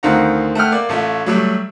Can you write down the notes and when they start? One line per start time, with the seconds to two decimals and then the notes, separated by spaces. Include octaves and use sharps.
0.03 D2 D#3 C4 F4 F#5 A#5
0.55 A3 F#5 G5 F6
0.72 A#3 D5
0.89 A1 A3 F4
1.26 F#3 G3 A3